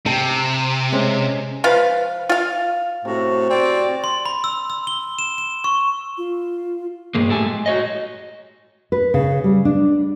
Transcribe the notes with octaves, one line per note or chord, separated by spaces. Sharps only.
C3 G5 A5
G#3 C#4 C5
F3 F4 B4 F5
F4 F5
A2 C3 F#4
C4 D5
C6
B5
E6
E6
G7
E7
E7
C#6
F4
G2 G#3 A#3
A2 G4 A4 F#5 G#5
G#3
F#4 C#5 D#5
B4
C#3
G3
D4